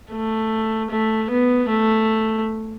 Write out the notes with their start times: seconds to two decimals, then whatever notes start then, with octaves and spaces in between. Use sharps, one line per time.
0.11 A3
0.90 A3
1.30 B3
1.69 A3